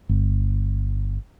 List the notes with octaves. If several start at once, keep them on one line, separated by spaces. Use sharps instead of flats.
G1